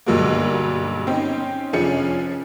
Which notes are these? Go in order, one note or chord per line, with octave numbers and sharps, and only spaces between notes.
B1 G2 D3 F#3 G#3 A#3
C4 C#4 D#4
F1 F3 C#4 D4 G#4 C#7